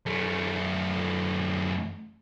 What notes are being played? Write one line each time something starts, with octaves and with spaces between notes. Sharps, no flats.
F#2 A3